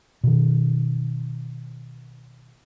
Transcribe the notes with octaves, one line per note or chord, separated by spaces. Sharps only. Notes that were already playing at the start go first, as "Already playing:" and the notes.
B2 D#3